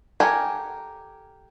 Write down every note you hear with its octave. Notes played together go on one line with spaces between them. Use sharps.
G4 A4 A#4 F#5 G#5